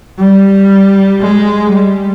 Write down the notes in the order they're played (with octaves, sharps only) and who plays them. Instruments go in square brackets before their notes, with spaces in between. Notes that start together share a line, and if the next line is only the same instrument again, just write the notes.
[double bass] G3
G#3
G3